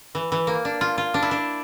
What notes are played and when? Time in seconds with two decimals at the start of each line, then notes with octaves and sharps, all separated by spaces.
0.15 E3
0.32 E3
0.47 A#3
0.65 D4
0.81 F4
0.98 F4
1.14 D4
1.22 E4
1.31 D4